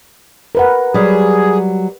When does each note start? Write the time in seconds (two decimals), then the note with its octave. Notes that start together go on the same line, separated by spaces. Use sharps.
0.55 A#4 B4 F#5
0.94 F#3 G3 G#4